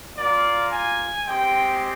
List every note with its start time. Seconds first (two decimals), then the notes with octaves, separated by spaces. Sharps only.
0.17 A#3 F4 D5
0.72 G#5
1.27 G#3 C4 G4 G5